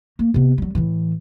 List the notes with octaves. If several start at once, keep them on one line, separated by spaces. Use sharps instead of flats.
A#3
C3 B3
F#3 G3
A2 E3